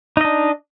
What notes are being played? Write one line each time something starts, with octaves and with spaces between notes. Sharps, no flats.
D4 D#4 D#5